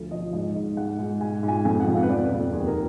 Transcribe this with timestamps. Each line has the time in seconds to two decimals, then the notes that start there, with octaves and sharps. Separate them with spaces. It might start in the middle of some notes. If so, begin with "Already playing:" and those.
Already playing: D2 F3
0.11 F3 D#5
0.33 G#2 D#5
0.55 G#2
0.77 G#2 F#5
0.99 G#2
1.21 G#2 G#5
1.43 G#2
1.48 G#5
1.65 F2 G#5
1.80 F#5
1.87 F2
1.94 F5
2.03 B4
2.09 F2 D5
2.31 F2
2.53 D#2 G#4
2.67 A#4